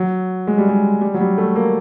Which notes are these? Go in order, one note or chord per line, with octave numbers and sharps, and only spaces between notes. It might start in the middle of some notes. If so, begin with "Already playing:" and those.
Already playing: F#3
G#3
G3
G#3
G3
F#3
G3
A3
A#3